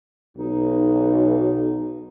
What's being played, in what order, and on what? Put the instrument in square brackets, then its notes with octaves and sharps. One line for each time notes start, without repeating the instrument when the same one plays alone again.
[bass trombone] B1 [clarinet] D#4